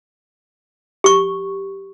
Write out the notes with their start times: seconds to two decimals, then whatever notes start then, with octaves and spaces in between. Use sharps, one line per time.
1.04 G4 C#6